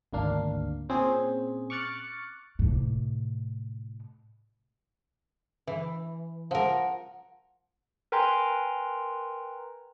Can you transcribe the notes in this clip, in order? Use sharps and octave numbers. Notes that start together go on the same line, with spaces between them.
G#1 D2 A#3 D4 F5
A#2 C4 C#4 G#4
C#6 D6 F6 F#6 A6 C#7
A2 C3
E3
F3 A#4 F#5
A#4 B4 G5 G#5 A#5 C6